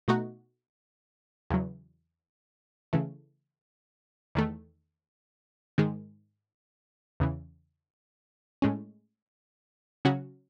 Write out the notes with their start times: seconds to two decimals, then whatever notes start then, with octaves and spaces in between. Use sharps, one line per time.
0.08 B2 A3 D#4 F#4
1.50 E2 C#3 F#3
2.93 C#3 E3 A3
4.35 E2 D#3 A3
5.78 G#2 D#3 G#3
7.20 E2 C#3 E3
8.62 A2 G#3 C#4
10.05 C#3 F#3 C#4 F#4